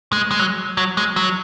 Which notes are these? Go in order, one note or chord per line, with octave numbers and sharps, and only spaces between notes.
G#3
G#3
F#3
F#3
G#3
F#3